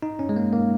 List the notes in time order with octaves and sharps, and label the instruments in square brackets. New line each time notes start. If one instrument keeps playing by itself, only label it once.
[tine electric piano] D#4
C#4
G#3
A#3
A#3